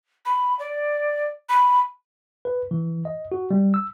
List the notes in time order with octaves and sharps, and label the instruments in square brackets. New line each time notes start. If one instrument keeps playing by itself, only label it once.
[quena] B5
D5
B5
[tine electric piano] B4
E3
D#5
F#4
G3
E6